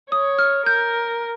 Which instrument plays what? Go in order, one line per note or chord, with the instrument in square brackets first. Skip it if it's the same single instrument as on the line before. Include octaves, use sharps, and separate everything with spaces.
[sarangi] C#5 [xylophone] D#6
[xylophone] F6
[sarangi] A#4 [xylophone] G6